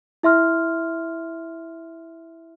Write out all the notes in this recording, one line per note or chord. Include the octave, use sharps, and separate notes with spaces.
E4 E5 C6 F6